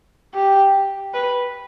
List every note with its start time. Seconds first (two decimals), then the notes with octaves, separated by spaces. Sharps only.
0.34 G4
1.14 B4